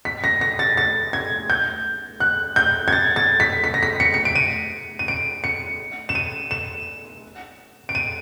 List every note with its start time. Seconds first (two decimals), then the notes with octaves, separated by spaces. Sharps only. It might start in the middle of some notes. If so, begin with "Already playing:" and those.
0.05 B6
0.24 A#6
0.41 A#6
0.59 A6
0.77 A6
1.13 G#6
1.50 G6
2.20 F#6
2.56 G6
2.88 G#6
2.92 A6
3.16 A6
3.40 B6
3.64 B6
3.74 A#6
3.83 B6
4.00 C#7
4.14 C#7
4.25 D7
4.35 D#7
4.99 D#7
5.08 D7
5.44 C#7
6.09 E7
6.15 D#7
6.51 E7
7.89 D7
7.95 D#7